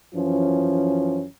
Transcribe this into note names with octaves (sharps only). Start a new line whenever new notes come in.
F#2 E3 F3 C#4